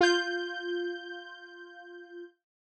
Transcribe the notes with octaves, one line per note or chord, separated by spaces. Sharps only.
F4 G6